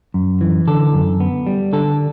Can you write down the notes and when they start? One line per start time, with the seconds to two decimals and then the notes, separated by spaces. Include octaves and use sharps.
0.14 F#2
0.41 E3
0.67 D3 A4
0.94 F#2
1.20 B3
1.47 G3
1.73 D3 A4